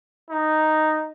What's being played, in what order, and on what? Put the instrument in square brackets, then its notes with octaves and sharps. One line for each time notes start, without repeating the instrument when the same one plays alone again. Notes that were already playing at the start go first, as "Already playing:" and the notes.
[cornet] D#4